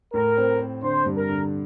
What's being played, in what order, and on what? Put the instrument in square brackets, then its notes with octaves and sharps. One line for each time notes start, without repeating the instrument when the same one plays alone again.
[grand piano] A2 [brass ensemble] A#4
[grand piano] C4
C4
[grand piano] D3 [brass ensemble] C5
[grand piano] G2
[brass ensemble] A#4
[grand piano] D3